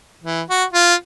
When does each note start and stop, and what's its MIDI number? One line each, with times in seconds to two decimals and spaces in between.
0.24 0.41 52
0.50 0.64 66
0.73 0.95 65